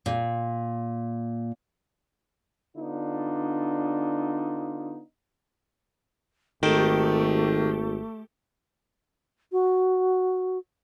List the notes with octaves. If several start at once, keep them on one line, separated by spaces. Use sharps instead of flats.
A#2
D3 B3 D4 D#4 F4
G#1 D#3 A3 G4 A4
F#4